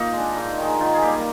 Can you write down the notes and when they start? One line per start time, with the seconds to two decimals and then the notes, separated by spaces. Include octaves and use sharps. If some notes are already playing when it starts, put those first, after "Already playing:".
Already playing: A#3 D#4 F4 A#4
0.13 G#3 D4
0.36 G#2
0.58 D#3 G#3
0.80 D#3 F4
0.94 G#4
1.02 G3 A#3 G4